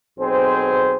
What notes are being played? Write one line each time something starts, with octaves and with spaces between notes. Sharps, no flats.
B1 C4 G#4 C5